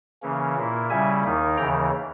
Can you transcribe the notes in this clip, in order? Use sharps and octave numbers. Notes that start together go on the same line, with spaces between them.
C#3 E3 A#3 C#4
A#2 A#3 E4
C#3 G3 C#4 E4 E5 G#5
D#2 D#3 A#3 D#4
D#2 C#3 E3 G5 A#5